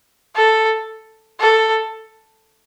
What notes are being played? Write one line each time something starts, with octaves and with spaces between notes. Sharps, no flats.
A4
A4